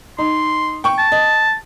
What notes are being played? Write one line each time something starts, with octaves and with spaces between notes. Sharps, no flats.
D#4 C6
G5 C#6
A5
D#5